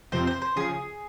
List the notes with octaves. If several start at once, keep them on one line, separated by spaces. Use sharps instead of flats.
F2 C3 F3 C4 C5
C5
C5
C#3 F3 G#4